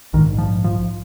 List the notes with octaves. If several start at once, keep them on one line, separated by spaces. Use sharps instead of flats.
A#1 G#2 D#3
F3
F3